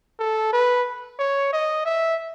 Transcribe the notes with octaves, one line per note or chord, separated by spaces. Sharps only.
A4
B4
C#5
D#5
E5